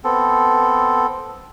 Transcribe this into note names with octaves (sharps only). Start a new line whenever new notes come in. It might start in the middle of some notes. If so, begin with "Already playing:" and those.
B3 C4 A4